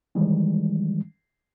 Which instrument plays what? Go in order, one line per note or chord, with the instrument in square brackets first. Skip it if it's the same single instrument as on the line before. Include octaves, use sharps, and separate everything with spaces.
[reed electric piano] D#3 E3 G3 G#3